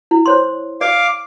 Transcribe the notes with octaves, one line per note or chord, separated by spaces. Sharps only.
E4
C5 C#5 C6
D5 F5 D6